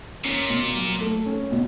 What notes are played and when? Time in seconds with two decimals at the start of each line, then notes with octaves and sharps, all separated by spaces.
0.24 A#2 C#4
0.50 B2
0.75 F#3
1.01 A3
1.26 C#4
1.52 B2